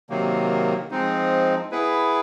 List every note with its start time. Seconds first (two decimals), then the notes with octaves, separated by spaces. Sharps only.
0.10 C3 D#3 F#3 A#3
0.91 F3 G#3 C4 D#4
1.71 B3 E4 G#4 B4